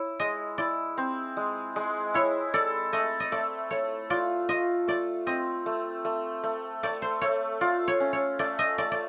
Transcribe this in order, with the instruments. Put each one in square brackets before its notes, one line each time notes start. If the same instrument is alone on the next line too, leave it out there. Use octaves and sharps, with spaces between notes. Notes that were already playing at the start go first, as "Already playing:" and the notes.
Already playing: [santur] E4 [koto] C#5
[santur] G#3 [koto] D#5
[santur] E4 [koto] D5
[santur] C4
G#3
G#3
[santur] E4 [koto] C#5
[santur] A4 [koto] D5
[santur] A3 [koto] D#5
[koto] D#5
[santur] A3 [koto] D5
[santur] A3 [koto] C#5
[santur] F4 [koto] D5
[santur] F4 [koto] D#5
[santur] A3 [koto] D5
[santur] C4 [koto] D#5
[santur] A3
A3
A3
[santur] A3 [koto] D5
[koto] C5
[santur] A3 [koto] C#5
[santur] F4 [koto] D5
[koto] C#5
[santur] C#4
[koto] C#5
[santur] A3 [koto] D5
[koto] D#5
[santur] A3 [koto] D5
[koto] D5